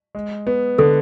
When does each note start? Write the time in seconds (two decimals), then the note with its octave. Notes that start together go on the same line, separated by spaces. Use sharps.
0.15 G#3
0.47 B3
0.78 D3 A4